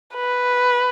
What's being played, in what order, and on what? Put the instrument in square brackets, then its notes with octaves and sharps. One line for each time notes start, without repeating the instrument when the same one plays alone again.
[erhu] B4